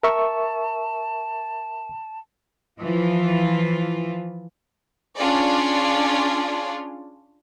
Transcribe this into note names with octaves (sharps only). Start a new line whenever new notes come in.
A#4 E5 A5 C#6
E3 F3 F4
C#4 D4 F4 G#4 C#5 D5